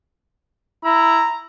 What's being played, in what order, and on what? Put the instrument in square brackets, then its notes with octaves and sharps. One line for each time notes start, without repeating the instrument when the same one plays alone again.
[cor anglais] E4 [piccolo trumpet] A#5